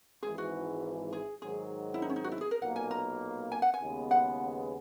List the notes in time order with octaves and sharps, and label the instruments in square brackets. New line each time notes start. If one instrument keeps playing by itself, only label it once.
[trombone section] G#1 G#2 E3 [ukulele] G#4
[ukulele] F#4
G#4
[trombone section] G#2 D#3 F#3 [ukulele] G#4
[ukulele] E4
D#4
C#4
D#4
F#4
E4
G#4
A#4
[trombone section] B1 A#2 A#3 [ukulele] F#5
[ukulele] G#5
A#5
G#5
F#5
G#5
[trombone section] D#2 C#3 G#3 B3
[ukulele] F#5